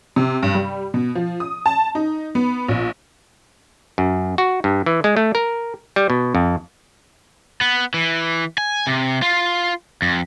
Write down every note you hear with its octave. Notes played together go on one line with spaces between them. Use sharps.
C3
G2
G3
B2
F3
D#6
A5
D#4
B3
A#1
F#2
F#4
G2
E3
G#3
A3
A#4
G3
B2
F2
B3
E3
G#5
C3
F4
F2